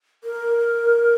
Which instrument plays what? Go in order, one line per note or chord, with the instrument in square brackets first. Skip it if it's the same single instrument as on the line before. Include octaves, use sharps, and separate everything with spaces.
[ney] A#4